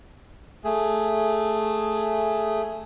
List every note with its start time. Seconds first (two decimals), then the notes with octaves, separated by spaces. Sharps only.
0.64 A3 G#4